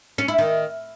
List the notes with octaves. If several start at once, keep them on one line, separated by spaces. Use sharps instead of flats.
C#4
E4
D#3